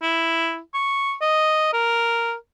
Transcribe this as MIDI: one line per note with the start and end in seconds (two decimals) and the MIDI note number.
0.02 0.59 64
0.74 1.14 85
1.21 1.69 75
1.73 2.34 70